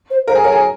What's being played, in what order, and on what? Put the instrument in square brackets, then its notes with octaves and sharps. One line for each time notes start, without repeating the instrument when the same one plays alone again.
[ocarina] C5
[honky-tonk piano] A#4 [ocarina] C5
[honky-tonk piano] G#4
[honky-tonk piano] A#4 [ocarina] C#5
[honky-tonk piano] G#4